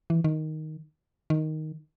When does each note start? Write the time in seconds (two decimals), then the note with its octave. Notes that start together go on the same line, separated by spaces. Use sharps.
0.10 E3
0.24 D#3
1.30 D#3